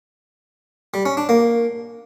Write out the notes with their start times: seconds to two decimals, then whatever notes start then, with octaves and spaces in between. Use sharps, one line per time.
0.94 G3
1.05 C#4
1.17 D4
1.29 A#3